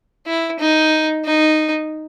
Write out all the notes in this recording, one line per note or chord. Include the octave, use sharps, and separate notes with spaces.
E4
D#4
D#4